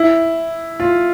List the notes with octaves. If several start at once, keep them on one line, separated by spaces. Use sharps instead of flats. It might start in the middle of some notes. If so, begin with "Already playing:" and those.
Already playing: E4
F4